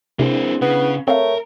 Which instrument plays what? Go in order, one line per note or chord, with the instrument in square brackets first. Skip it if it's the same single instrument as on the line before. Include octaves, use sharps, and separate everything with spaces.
[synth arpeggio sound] C3 [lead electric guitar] A#3 C4 [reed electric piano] D4 E4 G#4
[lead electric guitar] C#3 [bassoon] B3
[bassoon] A3 [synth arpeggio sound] C4 F5 [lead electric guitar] A#4 [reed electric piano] C#5